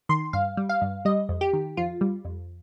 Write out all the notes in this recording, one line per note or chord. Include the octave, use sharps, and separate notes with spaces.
D#3 C6
G2 F5
G3
F5
G2
G3 D#5
F2
G4
D#3
F2 F4
G3
F2